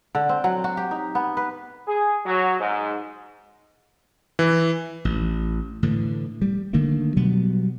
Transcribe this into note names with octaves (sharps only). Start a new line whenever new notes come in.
D3
C4
F#3
F#4
G4
D#4
B3
B4
G#4
F#3
G#2
E3
A1
A2 D3 E3
G3
D3 D#3 A3 A#3
B2 F#3 G3 B3